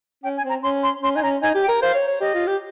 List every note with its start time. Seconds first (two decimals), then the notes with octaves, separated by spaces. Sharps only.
0.24 C#4 G5
0.37 G#5
0.44 C4
0.49 A#5
0.63 C#4 C6
0.83 C6
1.03 C#4 C6
1.16 D#4 G#5
1.23 C#4 A#5
1.42 D#4 G#5
1.55 G4
1.63 G5
1.69 A#4
1.82 C5 F5
1.95 C#5
2.08 C#5
2.21 G4 D#5
2.35 F4
2.47 G4